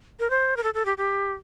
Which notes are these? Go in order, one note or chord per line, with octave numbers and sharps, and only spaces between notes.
A#4
C5
A#4
A4
A4
G4
G4